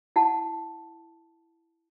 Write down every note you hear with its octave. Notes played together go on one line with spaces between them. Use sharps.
E4 F#5 A5